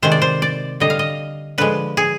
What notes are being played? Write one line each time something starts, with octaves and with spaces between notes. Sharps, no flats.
C3 D#3 G#3 C5
D5
C5
D5
D3 G3 D#5
F5
D#5
D3 F3 G#3 B4
G#4